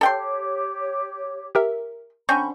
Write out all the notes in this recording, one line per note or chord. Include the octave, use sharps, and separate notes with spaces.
G4 A4 C#5 G5 C6
G4 A#4 E5
D3 C4 C#4 B5 C#6 G6